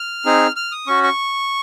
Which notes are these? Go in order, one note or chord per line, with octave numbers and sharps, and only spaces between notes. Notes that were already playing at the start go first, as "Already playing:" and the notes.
Already playing: F6
C4 D#4 G#4
F6
D#6
C#4 F#4 C#6
C#6